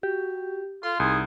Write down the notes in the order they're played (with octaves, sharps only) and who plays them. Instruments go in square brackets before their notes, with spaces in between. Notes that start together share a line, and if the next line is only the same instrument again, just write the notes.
[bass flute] F#4 [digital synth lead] G4
[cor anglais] F4 [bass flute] A4 [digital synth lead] C6
[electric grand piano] C2 [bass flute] D#4 [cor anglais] G#4